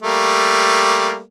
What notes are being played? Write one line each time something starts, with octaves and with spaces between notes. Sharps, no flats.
G3 A3 A#3